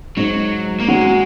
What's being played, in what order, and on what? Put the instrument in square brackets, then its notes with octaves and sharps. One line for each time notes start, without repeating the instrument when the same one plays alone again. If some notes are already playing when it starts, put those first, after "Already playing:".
[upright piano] G#2 [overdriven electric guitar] F#3
[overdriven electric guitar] A#3
[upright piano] F#3 [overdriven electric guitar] G#3